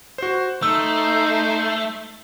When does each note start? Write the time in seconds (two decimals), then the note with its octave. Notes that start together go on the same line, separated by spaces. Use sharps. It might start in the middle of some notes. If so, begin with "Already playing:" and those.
0.18 F#4 C5
0.63 A3 D#4 C5 E6